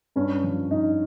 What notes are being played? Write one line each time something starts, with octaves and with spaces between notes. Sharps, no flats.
G2 C#4
F3
G2 D#4